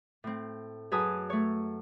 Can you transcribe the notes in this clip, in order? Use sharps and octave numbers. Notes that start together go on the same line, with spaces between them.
A2 C4
F#2 G#4 B4 G#5 A5 D#6
A3 C#5